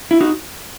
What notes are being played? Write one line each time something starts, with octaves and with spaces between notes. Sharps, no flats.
E4
D#4 F#4